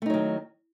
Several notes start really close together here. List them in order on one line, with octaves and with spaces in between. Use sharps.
A3 D#4 F#3 D#3